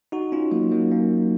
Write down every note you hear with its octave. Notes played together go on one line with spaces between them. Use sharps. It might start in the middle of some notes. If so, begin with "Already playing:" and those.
D#4 F#4
C#4 F4
F#3 A#3
F#3 A#3
A#3 C#4